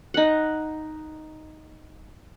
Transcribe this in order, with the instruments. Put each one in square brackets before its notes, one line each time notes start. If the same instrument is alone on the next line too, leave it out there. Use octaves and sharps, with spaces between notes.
[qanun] D#4 F#5